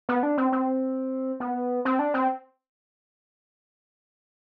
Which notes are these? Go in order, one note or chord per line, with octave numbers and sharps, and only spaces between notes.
B3
D4
C4
C4
B3
C4
D4
C4